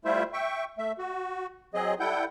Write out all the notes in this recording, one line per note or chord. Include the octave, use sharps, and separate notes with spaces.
G3 A3 E4 F4 C5 E5
E5 G5 C#6
A3 E5
F#4
F#3 C4 G#4 D#5
G3 E4 A4 F#5 G5 G6